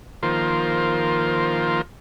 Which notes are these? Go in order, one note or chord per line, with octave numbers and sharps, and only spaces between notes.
D#3 F3 A#3 F4 A#4 C5